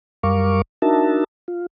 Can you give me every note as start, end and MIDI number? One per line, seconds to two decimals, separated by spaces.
0.23 0.62 42
0.23 0.62 55
0.23 0.62 70
0.23 0.62 77
0.23 0.62 85
0.23 0.62 86
0.82 1.24 62
0.82 1.24 63
0.82 1.24 66
0.82 1.24 70
0.82 1.24 76
0.82 1.24 81
1.48 1.66 65